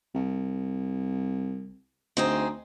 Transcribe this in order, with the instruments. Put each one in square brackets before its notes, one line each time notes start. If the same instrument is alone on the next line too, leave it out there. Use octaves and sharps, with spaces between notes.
[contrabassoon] C2
[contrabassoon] D2 [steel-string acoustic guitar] C4 D#4 G#4